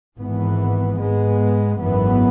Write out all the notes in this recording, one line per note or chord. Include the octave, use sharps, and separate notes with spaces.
G#1 G#2 E3 B3
G#2 G#3 B3
G#1 F#2 E3 B3